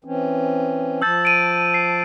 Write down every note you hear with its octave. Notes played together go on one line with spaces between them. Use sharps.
E3 C4 C#4
F3 A5 E6 G6 A6
D7 D#7
C7